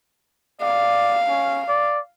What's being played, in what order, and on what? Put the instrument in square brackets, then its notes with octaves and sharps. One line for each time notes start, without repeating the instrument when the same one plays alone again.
[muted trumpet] D5 [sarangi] F5
[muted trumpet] C#4
D5